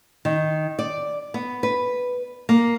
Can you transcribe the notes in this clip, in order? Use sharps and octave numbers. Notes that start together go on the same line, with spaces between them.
D#3
D5
B3
B4
A#3